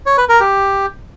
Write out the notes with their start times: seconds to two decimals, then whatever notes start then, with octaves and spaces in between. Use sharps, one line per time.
0.06 C#5
0.18 B4
0.29 A#4
0.40 G4